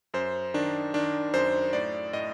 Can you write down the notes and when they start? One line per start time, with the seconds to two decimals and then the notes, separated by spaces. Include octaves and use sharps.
0.14 F#2 C5
0.54 D#3 D4
0.94 D#3 D4
1.34 F#2 C5
1.73 A2 D5
2.13 A2 D#5